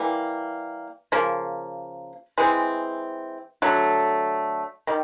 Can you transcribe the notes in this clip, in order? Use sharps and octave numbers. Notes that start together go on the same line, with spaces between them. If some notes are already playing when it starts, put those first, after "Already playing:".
Already playing: E3 G3 A#3
C#3 F3 A#3
E3 G#3 C4
D3 F#3 A3
D#3 G3